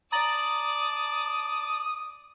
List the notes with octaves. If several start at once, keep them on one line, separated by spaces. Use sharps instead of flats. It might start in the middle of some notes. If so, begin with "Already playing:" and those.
D5 A5 A#5 D#6 A6 F#7